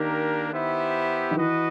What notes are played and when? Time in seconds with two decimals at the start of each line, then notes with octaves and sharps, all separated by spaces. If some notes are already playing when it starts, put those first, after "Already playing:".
Already playing: D#3 A#3 D4 G4 A#4
0.52 B3 E4 G4 C5 E5
1.31 D#3
1.37 E3 F#4 B4 D#5